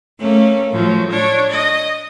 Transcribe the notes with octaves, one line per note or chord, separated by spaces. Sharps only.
A3 A#3 C#4
A2 F3 F#3
D4 C#5
D#5